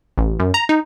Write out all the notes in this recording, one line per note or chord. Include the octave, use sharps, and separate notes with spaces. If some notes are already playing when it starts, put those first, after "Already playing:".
A1
F#2
A#5
D#4